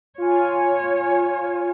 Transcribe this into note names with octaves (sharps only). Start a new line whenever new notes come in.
F4 C#5 G#5